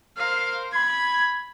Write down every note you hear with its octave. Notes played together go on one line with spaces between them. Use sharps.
A#4 C5 F5
B5 G#6